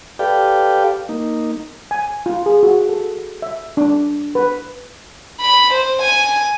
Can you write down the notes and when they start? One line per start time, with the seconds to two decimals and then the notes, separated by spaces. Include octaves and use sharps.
0.19 G4 A4 B4 D5 F5 G5
1.09 A#3 D#4
1.91 G#5
2.26 F4
2.46 G#4
2.63 F#4
2.89 A4
3.42 E5
3.77 D4
4.35 B4
5.41 B5
5.73 C5
6.02 G#5